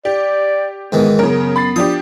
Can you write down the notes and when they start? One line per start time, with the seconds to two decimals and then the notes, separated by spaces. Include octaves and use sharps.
0.05 G4 D5
0.92 G#2 D#3 E3 B3
1.19 F#2 C#3 B3 A#4
1.56 B5 A6 C7
1.76 F3 D4 G4 D#6